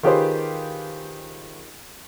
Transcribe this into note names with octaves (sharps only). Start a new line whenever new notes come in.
D#3 F4 G4 G#4 B4 C5